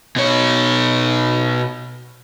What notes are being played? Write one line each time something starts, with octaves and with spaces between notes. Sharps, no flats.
B2 C#5